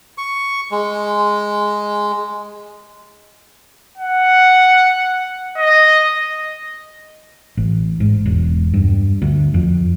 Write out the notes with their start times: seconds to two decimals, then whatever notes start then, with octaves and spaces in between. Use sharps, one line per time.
0.18 C#6
0.71 G#3
3.98 F#5
5.58 D#5
7.57 A1
8.00 G#2
8.26 E1
8.74 G2
9.22 D2
9.54 F2